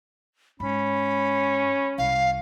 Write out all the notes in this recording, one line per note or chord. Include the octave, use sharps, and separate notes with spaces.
G#2 C#4 B5
C2 F5